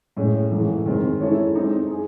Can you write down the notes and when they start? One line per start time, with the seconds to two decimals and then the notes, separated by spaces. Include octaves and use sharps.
0.16 A2 G#3 C#4
0.51 G#2 E3 A3
0.86 D#3 G#3 C4
1.20 G#3 C#4 E4 A4 C#5
1.55 G#3 C4 D#4
1.90 G#4